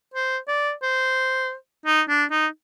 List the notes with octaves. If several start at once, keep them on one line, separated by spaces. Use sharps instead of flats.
C5
D5
C5
D#4
D4
D#4